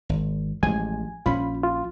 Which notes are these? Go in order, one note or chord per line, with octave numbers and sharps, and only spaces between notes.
G#1
A1 F3 G#3 G#5
A#1 F3 C#4 F4 B5
F4